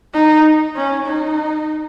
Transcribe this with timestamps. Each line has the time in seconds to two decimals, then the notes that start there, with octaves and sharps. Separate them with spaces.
0.14 D#4
0.76 C#4
1.06 D#4